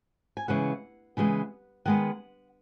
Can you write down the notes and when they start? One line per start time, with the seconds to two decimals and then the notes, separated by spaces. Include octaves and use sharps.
0.37 G#5
0.48 C#3 E3 G#3 B3 F#5
1.17 C#3 E3 G#3 B3
1.85 D#3 G#3 B3 F#5